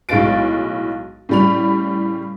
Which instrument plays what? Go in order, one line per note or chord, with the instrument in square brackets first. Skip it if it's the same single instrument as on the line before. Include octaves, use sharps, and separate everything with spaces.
[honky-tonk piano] B1 A2 G#3 F5 A6 D7
A2 C#3 G3 B5 F7